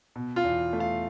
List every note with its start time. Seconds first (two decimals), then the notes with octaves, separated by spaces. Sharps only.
0.16 B2
0.36 F4 F5
0.44 E2
0.73 A3
0.80 F4 F5